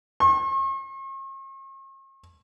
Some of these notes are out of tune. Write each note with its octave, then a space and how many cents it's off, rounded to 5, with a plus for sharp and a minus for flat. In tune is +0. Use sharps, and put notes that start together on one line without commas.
C#6 -45